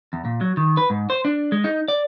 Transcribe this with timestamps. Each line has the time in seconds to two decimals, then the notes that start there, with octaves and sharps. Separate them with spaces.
0.13 E2
0.25 A#2
0.41 F#3
0.57 D#3
0.77 B4
0.90 G#2
1.10 C5
1.25 D4
1.52 G#3
1.64 D#4
1.88 D5